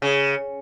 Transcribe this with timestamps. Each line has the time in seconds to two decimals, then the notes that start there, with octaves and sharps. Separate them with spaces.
0.02 C#3